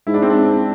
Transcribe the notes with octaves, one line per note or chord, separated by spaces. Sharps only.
G#2 E4
D4
C4
D4